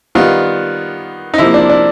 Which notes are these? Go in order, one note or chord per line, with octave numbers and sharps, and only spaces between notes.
D#3 G3 B3 F4
D#4
C3 F3 A#3 E4
D4
D4